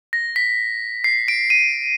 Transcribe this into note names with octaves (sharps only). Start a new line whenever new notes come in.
A#6
B6
C7
D7
D#7